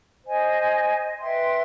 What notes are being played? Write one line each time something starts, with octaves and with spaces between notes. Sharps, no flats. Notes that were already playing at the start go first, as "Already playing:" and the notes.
C5 D#5 G#5
B4 E5 G5 C6